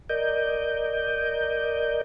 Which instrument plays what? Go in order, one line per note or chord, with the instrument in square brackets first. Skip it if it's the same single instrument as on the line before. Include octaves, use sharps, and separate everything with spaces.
[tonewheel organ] A#4 D5 D#5 G6